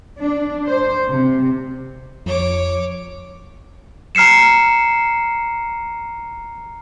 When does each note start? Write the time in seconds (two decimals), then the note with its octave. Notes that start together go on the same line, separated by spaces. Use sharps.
0.19 D4
0.68 C5
1.09 C3
2.26 F2 C#5 D6
4.15 A#5 F6 C7 C#7 E7